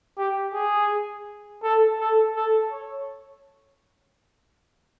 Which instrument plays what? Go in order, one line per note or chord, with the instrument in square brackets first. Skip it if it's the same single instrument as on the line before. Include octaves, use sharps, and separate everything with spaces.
[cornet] G4
G#4
A4
A4
A4
C#5